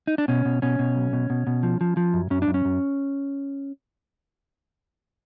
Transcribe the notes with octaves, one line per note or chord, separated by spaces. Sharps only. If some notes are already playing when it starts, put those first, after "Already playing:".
D#4
D4
B2 C#4
B2
B2 C#4
B2
B1
B2
B2
B2
F3
F3
F3
F#2
F#2 C#4
D4
F#2
C#4
F#2